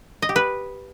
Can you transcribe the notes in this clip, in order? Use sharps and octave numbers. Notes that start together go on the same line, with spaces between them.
D#5
G4
B4